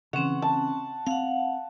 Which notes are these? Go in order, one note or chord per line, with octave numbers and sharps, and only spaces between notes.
C#3 E3 C4 C#4 F#5
A5
C4 F5 F#5